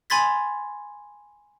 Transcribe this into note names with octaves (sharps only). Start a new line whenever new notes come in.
G#5 B5 C6 G#6 A6 B6